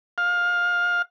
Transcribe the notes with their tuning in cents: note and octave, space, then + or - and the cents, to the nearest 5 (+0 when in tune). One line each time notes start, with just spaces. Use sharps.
F5 +20